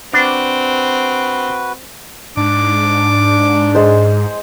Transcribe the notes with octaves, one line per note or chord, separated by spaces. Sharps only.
C4 D4 F#4 B4
G#2 D4 D6
G#3 C5